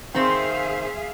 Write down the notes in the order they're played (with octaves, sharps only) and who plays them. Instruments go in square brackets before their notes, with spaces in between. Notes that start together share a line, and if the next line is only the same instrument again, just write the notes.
[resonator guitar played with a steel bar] D#3 C4 [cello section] G#4 E5 F5 [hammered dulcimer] C6